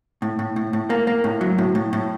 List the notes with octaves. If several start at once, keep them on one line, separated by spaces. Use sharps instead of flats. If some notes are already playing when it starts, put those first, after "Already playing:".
A2
A2
A2
A2
A#3
A#3
A2
F#3
A2
A2
A2